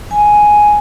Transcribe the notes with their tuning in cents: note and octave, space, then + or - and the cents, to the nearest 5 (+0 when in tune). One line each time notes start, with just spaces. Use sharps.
G#5 +5